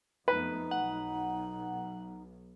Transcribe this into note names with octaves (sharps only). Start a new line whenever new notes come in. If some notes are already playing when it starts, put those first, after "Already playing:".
F2 A3 B3 D#4 B4
B1 F#5